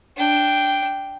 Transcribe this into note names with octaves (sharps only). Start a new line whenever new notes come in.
D4 G5